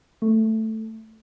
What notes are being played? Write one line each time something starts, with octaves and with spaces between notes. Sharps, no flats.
A3